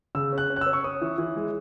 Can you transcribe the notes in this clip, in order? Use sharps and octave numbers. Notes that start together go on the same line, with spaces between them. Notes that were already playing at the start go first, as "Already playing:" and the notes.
C#3 E6
C#4
F#6
C#4
F#6
E6
C#4
C#6
C#4 D#6
E3
E3
G#3